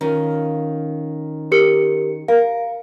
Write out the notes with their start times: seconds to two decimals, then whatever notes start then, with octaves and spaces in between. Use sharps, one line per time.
0.01 D#3 C#4 F4
1.52 G4 A#4 C#7
2.28 A#4 F5